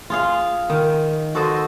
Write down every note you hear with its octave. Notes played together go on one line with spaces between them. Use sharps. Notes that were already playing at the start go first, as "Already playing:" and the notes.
F4 G#4 F5
D#3
F#4 A4 C5 D#5